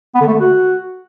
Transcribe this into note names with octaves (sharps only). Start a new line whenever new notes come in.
B3
D3
A3
D3
F#4